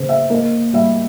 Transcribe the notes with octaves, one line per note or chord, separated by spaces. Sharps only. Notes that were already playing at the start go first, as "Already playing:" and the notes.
Already playing: C#3 B3 C5
E5
A#3 D#5
G3 E5